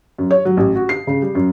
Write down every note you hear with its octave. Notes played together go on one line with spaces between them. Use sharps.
F#2
C#5
F#3
A1
F#4
C7
C#3
G3
F#2